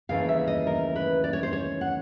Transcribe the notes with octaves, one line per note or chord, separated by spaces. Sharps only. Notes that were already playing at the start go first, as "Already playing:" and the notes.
D#2 C#3 E3 A3 F5
E5
D#5
A#4
B4
D5
C#5
C5
C#5
F#5